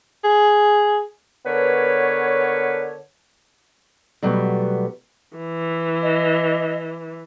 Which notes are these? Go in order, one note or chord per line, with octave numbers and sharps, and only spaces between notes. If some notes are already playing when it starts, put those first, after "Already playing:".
G#4
D3 B3 A#4 B4 C#5
B2 F#3 G3 A3 B3
E3
D#5